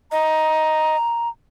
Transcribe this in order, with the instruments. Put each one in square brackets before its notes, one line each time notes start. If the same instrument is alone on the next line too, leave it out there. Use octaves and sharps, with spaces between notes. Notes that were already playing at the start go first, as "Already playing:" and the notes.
[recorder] D#5 [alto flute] A#5